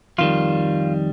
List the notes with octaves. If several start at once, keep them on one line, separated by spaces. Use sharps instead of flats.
F2 D#3 G3 F4